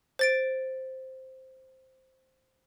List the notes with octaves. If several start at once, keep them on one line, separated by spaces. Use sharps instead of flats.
C5 A6 D7